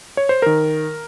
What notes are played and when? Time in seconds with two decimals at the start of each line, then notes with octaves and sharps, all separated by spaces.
0.17 C#5
0.29 C5
0.42 D#3 A#4